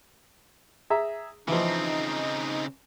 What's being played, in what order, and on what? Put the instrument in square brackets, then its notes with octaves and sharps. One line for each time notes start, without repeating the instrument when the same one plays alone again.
[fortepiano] G#4 E5 A#5
[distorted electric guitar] C#3 C4 [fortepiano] E3 F3 [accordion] D#4